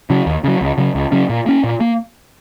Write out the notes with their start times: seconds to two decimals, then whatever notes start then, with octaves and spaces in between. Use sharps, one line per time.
0.10 C#3 F#3
0.26 D#2
0.44 C#3 F#3
0.61 C#2
0.78 C#3 F#3 C#4
0.95 C#2
1.12 C#3 F#3 C#4
1.29 A#2
1.46 A#3 C#4
1.64 A#2
1.81 A#3